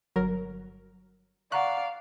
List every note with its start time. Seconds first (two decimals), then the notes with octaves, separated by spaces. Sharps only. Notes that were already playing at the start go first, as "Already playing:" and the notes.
0.16 G1 F#3 A#4
1.52 D5 F5 F#5 A#5 C#6 F#6